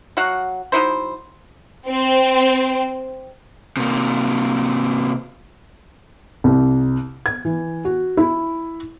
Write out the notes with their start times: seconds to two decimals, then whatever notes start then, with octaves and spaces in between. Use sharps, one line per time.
0.17 F#3 F#4 F5 F#5
0.72 F#3 D#4 E4 C5
1.88 C4
3.77 C3 A#3
6.44 C2
7.26 G#6
7.45 E3
7.85 F#4
8.17 E4